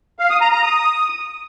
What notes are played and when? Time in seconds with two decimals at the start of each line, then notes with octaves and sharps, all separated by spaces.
0.19 F5
0.30 D#6
0.41 A#5
0.52 A#5
0.63 D#6